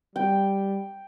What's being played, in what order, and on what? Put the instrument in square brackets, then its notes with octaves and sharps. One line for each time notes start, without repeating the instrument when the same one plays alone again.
[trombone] G3 [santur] G5